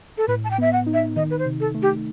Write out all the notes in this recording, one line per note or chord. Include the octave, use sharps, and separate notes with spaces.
A4
A2 B4
A5
G5
B3 E5
F#5
D#4
E5
D#3 D#5
B4
C5
C3
A4
A3
G4